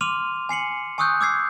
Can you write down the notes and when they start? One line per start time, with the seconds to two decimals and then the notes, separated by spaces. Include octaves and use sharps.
0.01 C6 D6 F6 D#7 F7
0.49 G#5 C7 C#7 F#7
0.98 G#5 C#6 D#6 E6 F#6 G6
1.21 D6 E6 G#6 C7